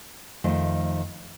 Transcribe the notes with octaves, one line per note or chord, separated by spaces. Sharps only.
F2 D#3 A3 F4 C5